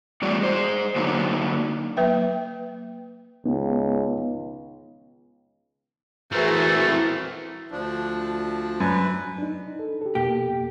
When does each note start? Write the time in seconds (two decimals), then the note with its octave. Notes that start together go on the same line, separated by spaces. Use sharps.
0.22 E2 A2 G3 F#4 D5
0.40 G#3 C5
0.96 D3 F#3 A#3 D4 D#4
1.97 F#3 A#3 B4 E5 G5
3.46 C#2 B3 D#4
6.32 E3 A3 C4 F#4 G#4 A#4
7.71 D2 F3 D4
8.80 F#2 B4
9.38 D4 D#4
9.79 A4
10.01 G4 A4
10.15 F2 B2 A#3 G4